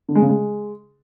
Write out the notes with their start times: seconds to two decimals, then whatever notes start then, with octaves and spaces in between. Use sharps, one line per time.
0.09 D3
0.15 G#3
0.22 C#3
0.29 G#3